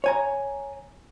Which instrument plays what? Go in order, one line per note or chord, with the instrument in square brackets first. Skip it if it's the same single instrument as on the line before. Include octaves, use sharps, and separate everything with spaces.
[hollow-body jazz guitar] C#5 G#5 A#5